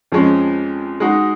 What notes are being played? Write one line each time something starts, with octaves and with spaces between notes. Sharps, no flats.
F2 F3 G#3 C#4
G#3 D#4 F#4